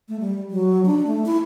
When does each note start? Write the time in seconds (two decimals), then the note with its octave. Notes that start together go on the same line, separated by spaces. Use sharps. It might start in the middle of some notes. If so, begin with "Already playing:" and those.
0.09 A3
0.20 G3
0.51 F#3
0.86 D4
1.07 A3
1.26 E4